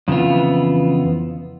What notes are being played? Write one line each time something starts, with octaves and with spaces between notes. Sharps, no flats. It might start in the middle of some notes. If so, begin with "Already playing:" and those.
F2 C#3 E3 B3 F4